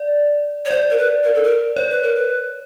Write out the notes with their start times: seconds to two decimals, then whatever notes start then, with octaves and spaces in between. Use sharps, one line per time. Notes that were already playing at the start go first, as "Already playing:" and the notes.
Already playing: D5
0.65 C#5
0.71 C5 D5
0.90 A#4
0.98 B4
1.23 A#4
1.34 A4
1.43 A#4
1.76 C5 C#5
1.90 B4
2.03 A#4
2.15 B4